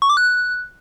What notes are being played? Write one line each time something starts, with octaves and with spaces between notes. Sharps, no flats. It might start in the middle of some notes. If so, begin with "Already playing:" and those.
C#6
D6
F#6